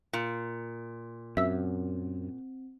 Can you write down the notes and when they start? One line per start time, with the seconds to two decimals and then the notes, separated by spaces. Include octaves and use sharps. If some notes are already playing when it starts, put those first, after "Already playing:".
0.13 A#2
1.37 F#2 C4 E5 E6